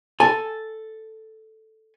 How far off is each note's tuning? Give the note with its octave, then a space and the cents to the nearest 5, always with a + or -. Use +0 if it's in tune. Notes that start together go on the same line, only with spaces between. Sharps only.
A4 +0 G#5 +0